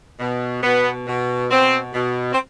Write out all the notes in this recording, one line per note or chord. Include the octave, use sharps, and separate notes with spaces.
B2
B2 B3
B2
B2 C4
B2
C4